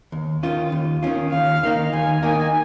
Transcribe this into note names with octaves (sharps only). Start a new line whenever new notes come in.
D#2
D#3 C#4 F4
D#2
D#3 C#4 F4
D#2 F5
D#3 A#3 D#4
D#2 G#5
D#3 A#3 D#4 G#5